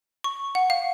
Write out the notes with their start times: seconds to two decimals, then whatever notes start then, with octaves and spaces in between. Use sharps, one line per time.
0.24 C#6
0.55 F#5
0.70 F5